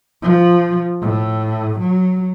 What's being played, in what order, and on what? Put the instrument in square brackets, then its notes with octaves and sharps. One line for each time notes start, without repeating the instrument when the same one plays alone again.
[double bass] F3
A2
F#3